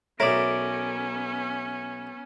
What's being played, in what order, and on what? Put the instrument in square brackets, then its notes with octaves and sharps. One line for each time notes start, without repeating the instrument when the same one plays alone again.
[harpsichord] B1 A3 [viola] B3 C#4 [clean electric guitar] A#4 D5 [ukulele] C#5